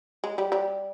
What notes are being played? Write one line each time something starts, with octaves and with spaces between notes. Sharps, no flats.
G#3
G3
G3